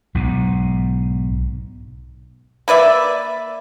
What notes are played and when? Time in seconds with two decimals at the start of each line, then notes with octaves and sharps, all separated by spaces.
0.15 B1 G#2
2.68 A#3 B4 D5 E5